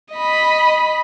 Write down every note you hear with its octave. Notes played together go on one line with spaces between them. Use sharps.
D#5 B5